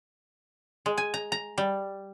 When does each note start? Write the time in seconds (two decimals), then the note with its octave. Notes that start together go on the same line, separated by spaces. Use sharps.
0.86 G#3
0.98 G#5
1.14 A#5
1.32 A#5
1.58 G3